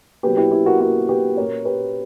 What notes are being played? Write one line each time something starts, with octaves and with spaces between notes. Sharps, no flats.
B2 F#3 A#3 C#4 G4 B4
E4 G4
E4 G4
F#4 A#4
B2 F#3 A#3 C#4 F#4
G4 B4
A#2 A#3 C#4 A#4 C#5
G4 B4